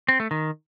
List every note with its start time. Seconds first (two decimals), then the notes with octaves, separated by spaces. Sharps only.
0.08 C4
0.20 A3
0.31 D#3